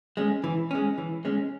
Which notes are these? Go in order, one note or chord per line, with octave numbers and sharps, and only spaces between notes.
G#3 C#4
E3
G#3 C#4
E3
G#3 C#4